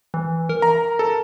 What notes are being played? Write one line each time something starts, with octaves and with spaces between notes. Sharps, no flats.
E3
A#4
A#5
A4